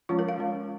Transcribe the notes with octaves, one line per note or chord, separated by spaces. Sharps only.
F3 G#3 C#4 F4
A#4
F5
F3 G#3 C#4